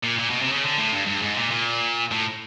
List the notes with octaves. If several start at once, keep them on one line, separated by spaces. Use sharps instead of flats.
A#2
A#2
B2
C3
C#3
D3
A2
G2
G2
G#2
A#2
A#2
A2